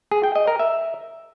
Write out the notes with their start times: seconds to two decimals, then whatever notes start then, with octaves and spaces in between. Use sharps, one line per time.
0.11 G#4
0.23 G5
0.35 D#5
0.47 A#4
0.59 E5